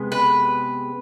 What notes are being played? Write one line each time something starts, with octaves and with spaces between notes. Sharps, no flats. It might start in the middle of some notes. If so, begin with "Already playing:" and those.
Already playing: C3 G#3 B3
B4